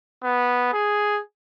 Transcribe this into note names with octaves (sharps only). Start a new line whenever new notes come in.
B3
G#4